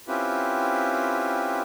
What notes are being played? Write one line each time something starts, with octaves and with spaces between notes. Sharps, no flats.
C4 C#4 E4 F4 G4 B4